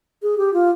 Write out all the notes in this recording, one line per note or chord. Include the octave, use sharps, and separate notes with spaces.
G#4
G4
F4